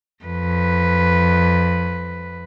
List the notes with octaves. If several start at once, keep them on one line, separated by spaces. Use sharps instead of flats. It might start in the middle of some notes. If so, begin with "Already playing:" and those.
F2 B4